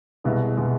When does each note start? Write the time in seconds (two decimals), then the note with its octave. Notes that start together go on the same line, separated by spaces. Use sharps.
0.24 C2 B2 G#3
0.57 B2 G#3